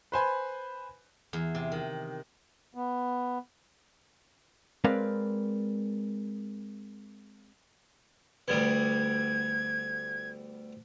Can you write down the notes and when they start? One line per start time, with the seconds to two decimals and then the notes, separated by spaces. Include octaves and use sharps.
0.12 B4 C5 G#5 B5
1.33 E2
1.55 C3
1.72 D#3
2.75 B3
4.84 G#3 C4 A#4 B4 D5 F5
8.48 D2 G3 B3 G#6